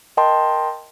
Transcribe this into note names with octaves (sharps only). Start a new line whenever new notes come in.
A#4 D#5 G5 A5 C6